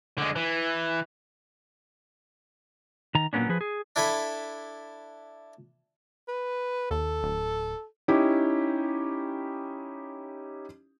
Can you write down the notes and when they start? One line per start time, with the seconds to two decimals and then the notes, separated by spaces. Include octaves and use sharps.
0.18 D3 G#3
0.36 E3
3.15 D#3 A#5
3.33 A#2 F#3 A#3 B3 C#4 D4
3.49 F3 G#4 B4
3.61 G#4
3.96 D4 E4 A4 G#5 B5
6.28 B4
6.91 D#2 A4
7.23 D1
8.08 C#4 D#4 E4 G4